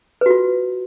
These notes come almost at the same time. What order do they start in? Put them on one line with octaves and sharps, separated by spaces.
B4 F#4 F4